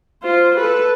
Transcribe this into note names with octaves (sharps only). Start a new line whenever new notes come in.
F4 C5
A4 B4